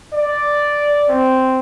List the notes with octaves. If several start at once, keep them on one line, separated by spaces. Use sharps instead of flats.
D5
C4